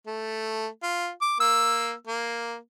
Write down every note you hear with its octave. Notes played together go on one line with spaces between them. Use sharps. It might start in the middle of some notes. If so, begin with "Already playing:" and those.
A3
F4
D6
A#3 E6
A#3